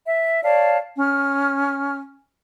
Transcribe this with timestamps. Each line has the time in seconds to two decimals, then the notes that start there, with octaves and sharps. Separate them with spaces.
0.05 E5
0.43 C#5 D5 F5 A5
0.98 C#4 F6